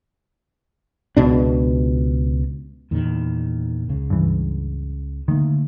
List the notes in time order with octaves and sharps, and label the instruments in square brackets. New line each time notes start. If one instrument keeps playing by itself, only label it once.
[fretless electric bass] C#2 B2 D4
E2 A#2 D#3
C#2 C#3
[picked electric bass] G2 E3
[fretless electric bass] D3 A3 A#3 [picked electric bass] D#3